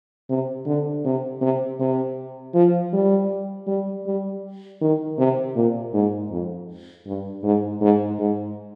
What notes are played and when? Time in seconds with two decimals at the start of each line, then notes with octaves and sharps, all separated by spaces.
0.30 C3
0.66 D3
1.05 C3
1.41 C3
1.80 C3
2.55 F3
2.93 G3
3.67 G3
4.06 G3
4.81 D#3
5.18 C3
5.56 A#2
5.94 G#2
6.31 F2
7.07 G2
7.44 G#2
7.81 G#2
8.19 G#2